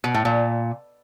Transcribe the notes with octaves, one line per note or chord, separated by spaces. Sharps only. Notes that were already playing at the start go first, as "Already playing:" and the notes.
B2
A2
A#2